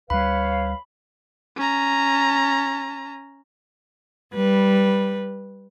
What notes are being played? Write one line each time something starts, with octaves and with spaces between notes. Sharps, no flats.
D2 G3 B4 C#5 F5 B5
C#4 A#5
G3 B4